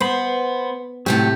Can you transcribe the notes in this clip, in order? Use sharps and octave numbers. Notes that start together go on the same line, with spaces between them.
B3 C5 B5
A2 C3 F#3 A3 G4